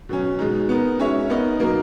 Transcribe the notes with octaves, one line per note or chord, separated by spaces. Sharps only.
B2 F#3 C#4
B2 G#3 D#4
B3 D#4 A#4
G#3 C#4 F#4 C#5 E5
B3 D#4 A#4 D#5
B2 F#3 A#3 D#4 A#4